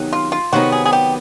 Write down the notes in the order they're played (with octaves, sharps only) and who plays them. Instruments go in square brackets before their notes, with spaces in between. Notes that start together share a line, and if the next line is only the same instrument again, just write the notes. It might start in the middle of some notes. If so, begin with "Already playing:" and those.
Already playing: [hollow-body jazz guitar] C3 D#3 F#3 B3 D#4
[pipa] F4
F4
[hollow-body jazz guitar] C3 D#3 F#3 B3 D#4 [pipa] F#4
[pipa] G#4
G#4
G4